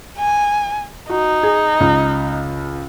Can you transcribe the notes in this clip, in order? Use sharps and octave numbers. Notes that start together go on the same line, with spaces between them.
G#5
D#4 F#4
G#4
C#2